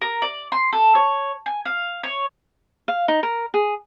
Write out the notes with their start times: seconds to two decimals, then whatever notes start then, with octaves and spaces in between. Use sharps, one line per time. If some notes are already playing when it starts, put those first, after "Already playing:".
0.01 A#4
0.22 D5
0.52 C6
0.73 A4
0.95 C#5
1.46 G#5
1.65 F5
2.03 C#5
2.88 F5
3.08 D#4
3.23 A#4
3.54 G#4